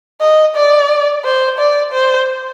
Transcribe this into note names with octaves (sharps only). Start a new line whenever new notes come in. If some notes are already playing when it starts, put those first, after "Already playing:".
D#5
D5
C5
D5
C5